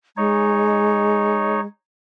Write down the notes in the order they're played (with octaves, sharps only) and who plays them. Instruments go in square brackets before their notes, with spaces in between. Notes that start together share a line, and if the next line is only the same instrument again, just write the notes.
[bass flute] G#3 [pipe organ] D#4 C#5